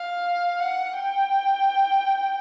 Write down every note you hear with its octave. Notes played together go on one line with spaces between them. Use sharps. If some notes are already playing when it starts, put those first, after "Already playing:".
Already playing: F5
F#5
G5